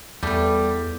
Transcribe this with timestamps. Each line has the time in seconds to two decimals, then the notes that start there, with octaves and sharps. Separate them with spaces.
0.23 E2 G3 A3 B3